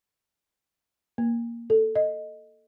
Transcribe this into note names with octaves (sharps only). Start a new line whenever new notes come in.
A#3
A4
D#5